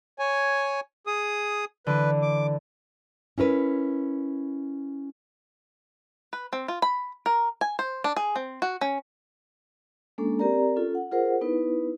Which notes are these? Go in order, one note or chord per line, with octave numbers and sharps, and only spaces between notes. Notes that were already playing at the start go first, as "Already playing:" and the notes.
C#5 G#5
G#4 D#6
D3 E3 B4
D6
C#4 E4 A#4 B4
B4
C4
F4
B5
A#4
G#5
C5
D4
G#4
C4
F#4
C#4
G#3 A#3 C#4 D4 A4
C4 G4 A#4 D5 A#5
C#4 F4 A4
F#5
F4 G#4 A#4 C5 F#5
B3 D#4 E4 B4